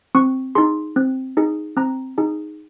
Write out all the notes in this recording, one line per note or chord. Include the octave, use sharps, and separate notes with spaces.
C4 C#6
D#4 G#4 C6
C4
D#4 G#4
C4 A#5
D#4 G#4